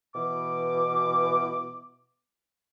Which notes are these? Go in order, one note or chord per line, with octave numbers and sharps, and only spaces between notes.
B2 E3 D6